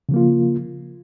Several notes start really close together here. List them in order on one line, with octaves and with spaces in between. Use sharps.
C#3 F3 A#3 F4